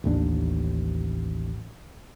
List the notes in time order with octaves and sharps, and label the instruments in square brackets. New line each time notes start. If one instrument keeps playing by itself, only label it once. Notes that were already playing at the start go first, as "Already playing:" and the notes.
[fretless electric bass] A1 D#2 A3 D4